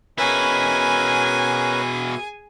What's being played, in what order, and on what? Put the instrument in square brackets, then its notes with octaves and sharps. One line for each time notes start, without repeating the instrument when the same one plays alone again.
[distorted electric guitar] B2 E4 [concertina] C#4 A#4 B4 [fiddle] G#4 G#5